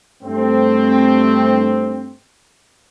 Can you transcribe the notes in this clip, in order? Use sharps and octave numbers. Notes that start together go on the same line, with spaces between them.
G2 A3 C4